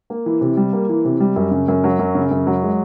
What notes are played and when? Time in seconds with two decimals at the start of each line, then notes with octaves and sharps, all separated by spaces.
0.10 A#3
0.26 E3
0.41 C3
0.57 G3
0.73 A#3
0.89 E3
1.05 C3
1.20 G3
1.36 F#2
1.51 C#3
1.68 F#2
1.84 F#3
1.99 F#2
2.15 C#3
2.31 F#2
2.47 F#3
2.62 G#3